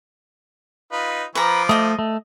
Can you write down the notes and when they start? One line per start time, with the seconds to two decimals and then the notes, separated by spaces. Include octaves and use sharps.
0.92 D#4 F4 B4
1.35 F3 B4 A#5 D6
1.69 A3 D#5 D#6
1.99 A3